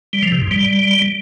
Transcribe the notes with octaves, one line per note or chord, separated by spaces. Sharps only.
G3
F3
C3
G#2
G3